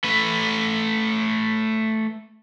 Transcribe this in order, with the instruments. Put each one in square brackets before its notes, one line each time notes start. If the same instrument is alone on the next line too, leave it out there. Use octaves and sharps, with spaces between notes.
[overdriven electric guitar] A3 B4